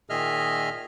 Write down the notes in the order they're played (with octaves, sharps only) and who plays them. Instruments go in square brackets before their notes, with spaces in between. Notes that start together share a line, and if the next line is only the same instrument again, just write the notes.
[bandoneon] A#2 D#3 G#4 D#5 E5 F6